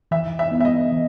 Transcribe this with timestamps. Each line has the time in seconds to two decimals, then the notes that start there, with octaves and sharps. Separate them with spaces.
0.11 E3 E5
0.39 E5
0.51 B3
0.60 E5
0.65 D#5
0.92 E3